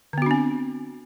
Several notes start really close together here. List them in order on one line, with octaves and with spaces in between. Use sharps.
D3 B3 F#4 D4 C4